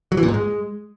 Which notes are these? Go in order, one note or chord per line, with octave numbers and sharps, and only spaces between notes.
F#3
E3
A#2
G#2
G#3